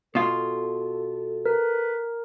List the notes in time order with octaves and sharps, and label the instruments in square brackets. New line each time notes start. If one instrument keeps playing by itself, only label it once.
[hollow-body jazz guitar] B2 F4 [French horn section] A4
[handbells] A#4 [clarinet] B4